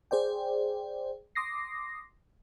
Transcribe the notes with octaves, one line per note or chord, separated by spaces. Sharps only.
G#4 C5 D5 G5
C6 D6 D#6 A#6 C7